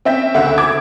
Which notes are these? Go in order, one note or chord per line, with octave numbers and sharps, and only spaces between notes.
C4 C#4 E5 G5 G6 B6
D2 C#3 E5 F#5
D6 G#6